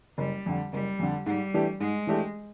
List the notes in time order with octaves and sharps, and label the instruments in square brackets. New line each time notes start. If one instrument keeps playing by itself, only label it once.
[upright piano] F#1 [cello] G3
[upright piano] F2 D3
[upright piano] F#1 [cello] G3
[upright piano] F2 D3
[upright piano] G#2 [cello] G3
[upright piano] E3 A3 D4 G4
[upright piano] G#2 [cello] G#3
[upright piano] E3 A3 D4 G4